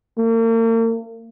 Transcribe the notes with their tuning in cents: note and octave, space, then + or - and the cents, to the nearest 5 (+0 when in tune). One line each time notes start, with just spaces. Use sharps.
A#3 -40